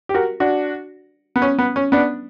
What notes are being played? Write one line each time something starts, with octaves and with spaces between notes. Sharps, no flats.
G4
F#4 A#4
D4 F#4
B3
C#4
B3
C#4
B3 D4